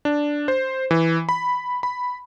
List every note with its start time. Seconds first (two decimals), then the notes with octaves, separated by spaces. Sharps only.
0.05 D4
0.48 C5
0.91 E3
1.29 B5
1.83 B5